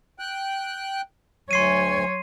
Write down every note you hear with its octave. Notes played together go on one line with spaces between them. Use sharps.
G5 F#6
D2 F#3 C#5 G#5 C6 C7 D#7